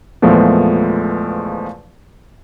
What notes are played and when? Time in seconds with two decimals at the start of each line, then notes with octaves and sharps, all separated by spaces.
0.22 E2 A#2 F3 G#3 A3 B3